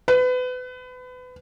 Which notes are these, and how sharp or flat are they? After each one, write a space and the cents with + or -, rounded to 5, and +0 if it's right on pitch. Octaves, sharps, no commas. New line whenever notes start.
B4 +30